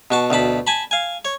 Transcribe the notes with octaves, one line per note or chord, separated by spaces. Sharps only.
B2 F#4 A5
D2 B2 A5 B5
G#5 A5 B5
F5 G#5
C#5